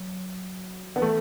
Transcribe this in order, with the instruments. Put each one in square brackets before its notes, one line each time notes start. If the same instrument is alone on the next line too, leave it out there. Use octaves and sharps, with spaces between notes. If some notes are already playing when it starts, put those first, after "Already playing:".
Already playing: [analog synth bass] F#3
[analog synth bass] D3 [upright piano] B3
[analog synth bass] E3 [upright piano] A3